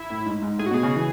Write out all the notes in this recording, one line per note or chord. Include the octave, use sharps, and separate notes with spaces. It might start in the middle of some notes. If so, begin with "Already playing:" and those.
Already playing: E4
A2
G#2
G#2
A2 G#4
F#4
B2 G#4
C#3
E3